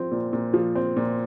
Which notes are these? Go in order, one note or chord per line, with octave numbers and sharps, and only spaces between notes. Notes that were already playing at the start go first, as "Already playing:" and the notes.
Already playing: F3 C4
A#2
A#2
F3
C4
A#2